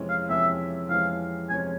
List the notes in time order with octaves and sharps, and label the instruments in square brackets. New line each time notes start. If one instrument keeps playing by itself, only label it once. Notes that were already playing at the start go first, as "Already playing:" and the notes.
Already playing: [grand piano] F2 C3 E3 G#3 C#4
[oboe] F5
[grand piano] F2 C3 E3 G#3 C#4 [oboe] E5
[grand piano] F2 C3 E3 G#3 C#4 [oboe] F5
[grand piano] F2 C3 E3 G#3 C#4 [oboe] G#5